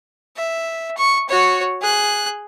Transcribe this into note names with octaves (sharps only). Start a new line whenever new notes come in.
E5
C#6
F#4 C#5
G#4 F#6